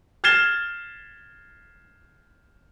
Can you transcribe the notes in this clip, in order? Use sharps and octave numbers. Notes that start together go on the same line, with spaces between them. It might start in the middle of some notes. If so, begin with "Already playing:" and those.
F6 G#6 A6 C7 E7 G7